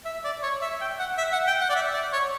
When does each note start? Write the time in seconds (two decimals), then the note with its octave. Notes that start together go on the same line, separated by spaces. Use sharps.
0.05 E5
0.24 D5
0.43 C#5
0.62 E5
0.81 G5
0.99 F#5
1.18 E5
1.32 F#5
1.47 G5
1.61 F#5
1.69 D5
1.75 E5
1.94 D5
2.13 C#5